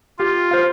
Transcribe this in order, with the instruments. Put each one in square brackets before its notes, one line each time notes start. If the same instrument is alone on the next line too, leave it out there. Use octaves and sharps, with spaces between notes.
[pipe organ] F4 [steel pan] G4
[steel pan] C5 F5